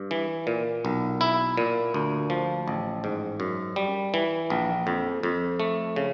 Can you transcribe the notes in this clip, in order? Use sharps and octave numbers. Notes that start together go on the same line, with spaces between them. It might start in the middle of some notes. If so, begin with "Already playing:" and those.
Already playing: G2
E3
A#2
B1
E4
A#2
D2
F3
A1
G#2
F#2
G3
E3
A#1
F2
F2
A3
C#3